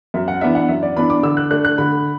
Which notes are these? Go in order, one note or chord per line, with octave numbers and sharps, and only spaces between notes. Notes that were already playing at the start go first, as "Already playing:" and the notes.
F#2 E5
F#5
E3 B3 D4 E5
F#5
F#2 E5
D5
E3 B3 D4 B5
D6
D3 E6
F#6
A3 D4 F#6
F#6
D3 B5